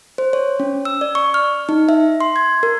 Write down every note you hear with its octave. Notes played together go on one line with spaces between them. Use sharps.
C5
C#5
C#4
E6
D5
C#6
F6
D#4
E5
C6
G#6
A#4